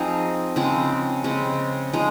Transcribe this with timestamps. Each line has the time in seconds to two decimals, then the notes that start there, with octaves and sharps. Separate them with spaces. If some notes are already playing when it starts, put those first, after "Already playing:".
Already playing: F3 C4 D#4 G#4
0.56 C#3 F3 G#3 C4
1.24 C#3 G#3 C4
1.93 F3 G#3 D#4